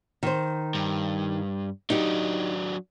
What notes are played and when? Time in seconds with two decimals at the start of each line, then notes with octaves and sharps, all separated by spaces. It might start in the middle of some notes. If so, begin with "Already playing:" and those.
0.23 D#3 C5
0.75 G2
1.90 F#3 D4 D#4 G4